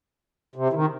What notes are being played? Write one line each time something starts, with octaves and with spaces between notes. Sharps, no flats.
C3
E3
D#3